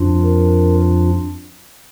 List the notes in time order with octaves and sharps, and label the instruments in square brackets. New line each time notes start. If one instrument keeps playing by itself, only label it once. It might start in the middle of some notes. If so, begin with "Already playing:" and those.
Already playing: [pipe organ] F2 F3 D4 F4
A#4